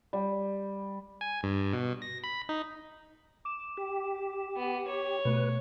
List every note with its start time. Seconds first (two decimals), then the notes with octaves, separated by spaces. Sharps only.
0.13 G3
1.21 G#5
1.43 G2
1.73 B2
2.02 A#6
2.24 B5
2.49 D#4
3.45 D6 E7
3.77 G4
4.57 B3
4.88 C#5
5.25 B2 A3 B4